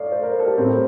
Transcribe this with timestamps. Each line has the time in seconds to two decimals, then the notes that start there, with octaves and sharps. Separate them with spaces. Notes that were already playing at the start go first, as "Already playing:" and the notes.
Already playing: A2 D5 F5
0.12 C5
0.23 A#4
0.40 A4
0.46 G4
0.58 A2 G3 C4